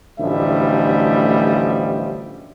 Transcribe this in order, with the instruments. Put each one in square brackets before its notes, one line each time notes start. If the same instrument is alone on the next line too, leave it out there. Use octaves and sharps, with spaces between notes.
[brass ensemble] A1 D2 F3 G3 D#5 E5